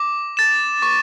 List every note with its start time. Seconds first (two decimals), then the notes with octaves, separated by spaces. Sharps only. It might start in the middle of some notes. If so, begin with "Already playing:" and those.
Already playing: D6
0.37 A6 E7
0.82 C#6